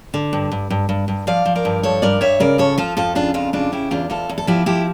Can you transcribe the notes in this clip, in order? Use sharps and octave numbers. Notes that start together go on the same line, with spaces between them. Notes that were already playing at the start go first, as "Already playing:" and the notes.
D3
G2
G2
G2
G2
G2
F3 D5 F5
F3
A#4 D5
G2
F3 A4 C#5
G2 A#4 D5
G2 C#5 E5
C#3 A#4 D5
F3 A4 C#5
F3 F4 A4
F2 F4 A4
C#3 D4 F4
F2 D4 F4
C#3 D4 F4
C#3 E4 G4
E2 D4 F4
E2 F4 A4
E2
A4
F3 E4 G4
F3 E4 G4